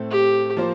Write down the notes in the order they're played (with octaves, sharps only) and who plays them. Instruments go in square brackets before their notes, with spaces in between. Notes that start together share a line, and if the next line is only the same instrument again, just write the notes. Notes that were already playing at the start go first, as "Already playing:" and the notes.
Already playing: [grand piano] A2 A3 C4
[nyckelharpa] G4
[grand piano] F3 A#3 F4 C5